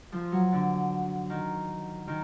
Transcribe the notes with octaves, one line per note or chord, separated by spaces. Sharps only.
F3
F#3
D3
D#3
D#3